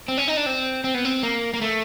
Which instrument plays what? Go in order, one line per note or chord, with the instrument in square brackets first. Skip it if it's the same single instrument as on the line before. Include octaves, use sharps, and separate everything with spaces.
[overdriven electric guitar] C4
C#4
D#4
D4
C4
C4
B3
C4
A#3
A#3
A3